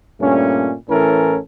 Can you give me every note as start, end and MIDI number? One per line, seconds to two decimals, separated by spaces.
0.20 0.74 43
0.20 0.74 46
0.20 0.74 57
0.20 0.74 61
0.89 1.38 45
0.89 1.38 52
0.89 1.38 61
0.89 1.38 69
0.89 1.38 70